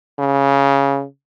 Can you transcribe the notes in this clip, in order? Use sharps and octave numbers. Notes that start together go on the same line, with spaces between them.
C#3